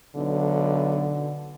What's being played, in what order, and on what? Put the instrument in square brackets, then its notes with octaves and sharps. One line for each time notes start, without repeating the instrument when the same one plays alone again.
[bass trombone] B1 [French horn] D3